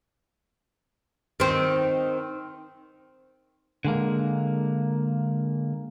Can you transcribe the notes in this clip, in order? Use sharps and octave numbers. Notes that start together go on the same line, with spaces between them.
D#3 C4
D3 G#3 A#3